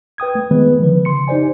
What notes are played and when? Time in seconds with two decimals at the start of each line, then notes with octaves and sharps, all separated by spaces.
0.18 B4 G5 D#6 G#6
0.35 A3
0.51 D#3 E3 G#3 B3 B4
0.80 D3 D#3 F3 B4
1.05 C#3 C6 C#7
1.28 D#4 G4 C5 D5 G#5